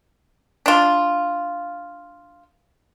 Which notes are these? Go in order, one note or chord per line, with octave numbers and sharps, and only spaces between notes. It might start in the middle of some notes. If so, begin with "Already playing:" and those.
D4 F4